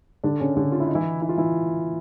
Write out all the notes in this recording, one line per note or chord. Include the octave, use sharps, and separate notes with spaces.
D3 D4
C#3 C#4
D3 D4
F4
E4
D#4
E3 E4
E4
F4
E3 E4